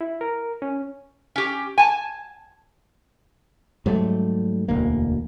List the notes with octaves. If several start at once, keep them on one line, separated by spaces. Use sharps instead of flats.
E4
A#4
C#4
C#4 G4
G#5 A5
G#2 F#3 G3 A3
E1 D2 A#3